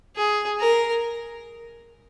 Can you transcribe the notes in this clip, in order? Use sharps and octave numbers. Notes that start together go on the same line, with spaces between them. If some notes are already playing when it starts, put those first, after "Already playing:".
G#4
A#4